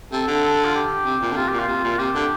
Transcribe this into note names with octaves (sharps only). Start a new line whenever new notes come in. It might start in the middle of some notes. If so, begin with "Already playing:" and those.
C3 A4
D3
A4
F4
G4
C3
A#2
D3
C3 F4
A#2 G4
F4
C3
A#2
F4
C3 G4
D3